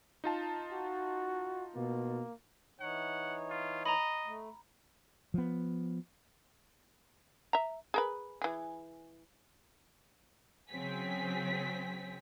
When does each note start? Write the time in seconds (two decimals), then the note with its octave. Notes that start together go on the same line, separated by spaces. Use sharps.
0.24 D#4 F4 A5
0.72 F#4
1.76 B2 A#3
2.80 E3 D#4 C#5 F#5
3.50 F4
3.86 D#5 A#5 B5
4.26 A3
5.34 F3 B3
7.53 E5 A#5
7.94 G#4 A#4 B4
8.42 E3 G#4
10.70 C#3 F#3 C4 G#5 B6